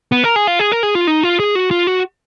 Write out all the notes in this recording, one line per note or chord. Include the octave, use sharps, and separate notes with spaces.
B3
A#4
G#4
F4
G#4
A#4
G#4
F4
D#4
F4
G#4
F#4
F4
F#4